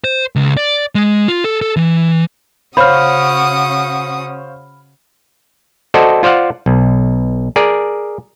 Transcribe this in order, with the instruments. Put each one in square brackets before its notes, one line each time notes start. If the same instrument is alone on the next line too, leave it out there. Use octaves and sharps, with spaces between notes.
[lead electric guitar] C5
C#2
D5
G#3
F4
A4
A4
E3
[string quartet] C#3 F#4 D#6 [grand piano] C5 C#5 F5 [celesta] B5 F6
[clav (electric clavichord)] F#4 A4 C5 D5 D#5
F4 C5 D5 F5 F#5
B1
G#4 A#4 D5